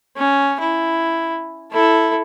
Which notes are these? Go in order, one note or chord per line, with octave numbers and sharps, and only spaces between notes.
C#4
E4
E4 A4